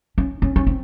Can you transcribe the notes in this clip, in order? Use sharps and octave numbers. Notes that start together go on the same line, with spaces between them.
C#4
C#4
C#4
C4